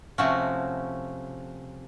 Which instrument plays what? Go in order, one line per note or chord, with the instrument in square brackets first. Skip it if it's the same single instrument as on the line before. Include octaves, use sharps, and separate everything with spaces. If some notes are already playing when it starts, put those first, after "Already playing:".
[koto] C3 F3 A3 C#4 F#4